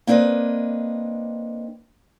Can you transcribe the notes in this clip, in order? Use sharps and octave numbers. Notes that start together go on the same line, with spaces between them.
A#3 C4 D4 B4 D#5